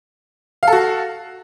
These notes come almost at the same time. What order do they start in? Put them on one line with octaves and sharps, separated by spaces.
F5 A4 F#4